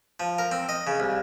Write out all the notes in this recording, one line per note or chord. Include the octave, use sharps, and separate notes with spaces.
F3
A#4
C4
D#5
C#3
C2